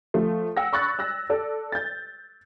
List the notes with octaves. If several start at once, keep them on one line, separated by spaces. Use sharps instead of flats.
F3 A3
F#5 G5 E6 A#6
B5 C#6 F#6 A6
E6 F#6 A#6
A4 D5
G6 A6